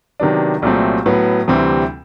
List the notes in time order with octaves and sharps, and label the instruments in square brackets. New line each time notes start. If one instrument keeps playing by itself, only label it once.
[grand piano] C3 D#3 F#3 B3 D4
C2 A#2 F#3 A3 C4
A2 F#3 B3
D2 C3 E3 G3 C4